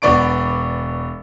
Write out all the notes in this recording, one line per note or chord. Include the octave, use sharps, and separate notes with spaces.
E1 B3 D5 C#6 D7